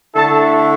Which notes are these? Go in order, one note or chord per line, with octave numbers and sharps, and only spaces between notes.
D3 A3 E4 A4 A5